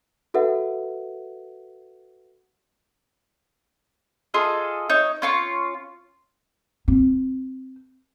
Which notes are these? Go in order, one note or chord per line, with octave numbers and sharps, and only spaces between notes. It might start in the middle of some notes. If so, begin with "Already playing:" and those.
F#4 A4 B4 E5 F#5
F4 G#4 A4 D#5
D#4 C#5
C#4 F4 C#6
C4